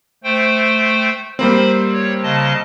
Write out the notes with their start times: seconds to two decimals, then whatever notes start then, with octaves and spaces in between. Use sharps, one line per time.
0.24 A3 C5 G5
1.39 G3 A#3 C4 C5 B5
1.93 C#5
2.23 C#3 D#5 A5